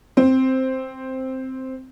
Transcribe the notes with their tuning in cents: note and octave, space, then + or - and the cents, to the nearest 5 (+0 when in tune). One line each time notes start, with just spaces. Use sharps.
C4 +0